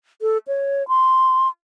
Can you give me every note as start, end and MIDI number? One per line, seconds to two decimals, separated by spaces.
0.22 0.38 69
0.48 0.86 73
0.88 1.48 84